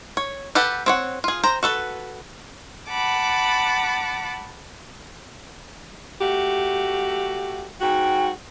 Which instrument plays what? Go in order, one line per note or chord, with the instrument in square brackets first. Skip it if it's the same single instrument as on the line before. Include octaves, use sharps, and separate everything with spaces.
[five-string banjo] C#5
G4 A4 B4 F#5
C4 C#5 F#5
F4 G#4
C5 G5 A#5
F#4 A4 B4
[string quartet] F#5 A5 B5 D6
[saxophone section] A3 F#4 G4
[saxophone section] G#2 F#4 [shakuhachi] G5